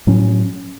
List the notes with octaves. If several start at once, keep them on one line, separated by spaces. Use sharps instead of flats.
A2 F#3 C#4